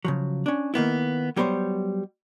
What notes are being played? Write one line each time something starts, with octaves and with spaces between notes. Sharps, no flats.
C#3 F3 F#3
C#4 D4
D#3 A#3 B3 E4
F#3 G3 B3 C5 C#5